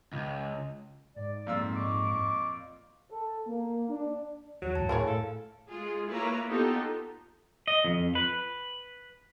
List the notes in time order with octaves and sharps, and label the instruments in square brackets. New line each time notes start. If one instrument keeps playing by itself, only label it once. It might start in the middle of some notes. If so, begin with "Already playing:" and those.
[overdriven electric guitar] C#2
[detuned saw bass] G#2 [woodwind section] D5
[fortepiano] F2 A#2 E6
[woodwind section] D#5 C#6 D6
[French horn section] A4
A#3
D4
[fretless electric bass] E2 [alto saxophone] F#3
[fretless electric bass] D2 G#2 [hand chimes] A5
[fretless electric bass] A2 [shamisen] E4 G#4 C#5 [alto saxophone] A#4
[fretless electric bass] A2 [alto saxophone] A4 [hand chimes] F5
[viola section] G#3 F4 G#4
A#3 E4 F4 B4 C#5 A#5
B3 D#4 F4 G4 A4
[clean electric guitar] D#5
F2
B4